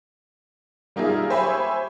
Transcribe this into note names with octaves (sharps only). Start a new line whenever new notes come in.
G3 A#3 D#4 F4 G#4 E5
G4 C5 C#5 E5 G#5 B5